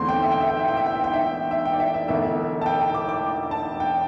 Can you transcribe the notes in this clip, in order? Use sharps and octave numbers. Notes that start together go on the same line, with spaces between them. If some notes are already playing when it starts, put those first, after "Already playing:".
Already playing: E2 D3 A3 C4 C6
G5
E5
G5
E5
G5
E5
G5
E5
G5
E5
G5
E5
E5
G5
D5
E5
E5
E1 E2 D3 A3 E5
A5
G5
A5
D6
D6
A5
G5